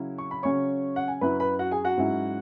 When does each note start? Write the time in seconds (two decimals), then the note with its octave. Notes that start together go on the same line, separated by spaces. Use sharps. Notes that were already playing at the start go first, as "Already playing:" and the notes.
Already playing: C#3 F#3 C#4 E4
0.18 C#6
0.31 B5
0.43 C#3 F#3 C#4 C#5 C#6
0.96 F#5
1.08 G#5
1.21 F#2 F#3 E4 B4 B5
1.40 B4 B5
1.59 F#4 F#5
1.71 G#4 G#5
1.84 F#4 F#5
1.97 G#2 F#3 C#4 E4